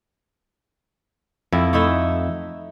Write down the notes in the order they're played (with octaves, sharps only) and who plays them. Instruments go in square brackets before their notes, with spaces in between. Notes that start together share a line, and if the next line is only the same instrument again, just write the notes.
[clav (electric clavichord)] F2 [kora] E4
[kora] A3 D#4 E4